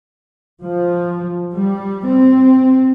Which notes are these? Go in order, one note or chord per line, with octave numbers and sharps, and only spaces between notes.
F3
G3
C4